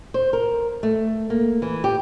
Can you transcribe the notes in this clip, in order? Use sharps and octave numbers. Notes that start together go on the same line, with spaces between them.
C5
A#4
A3
A#3
E3
G4